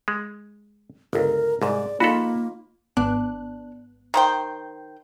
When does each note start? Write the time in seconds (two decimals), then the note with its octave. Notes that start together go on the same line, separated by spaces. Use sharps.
0.08 G#3
1.13 G1 C#2 A#4
1.62 C2 G#2 G#4 D5
2.00 A#3 D#4 F4 F#4 A4 B5
2.97 G#1 B3 D4 F#6
4.14 D#3 C5 G5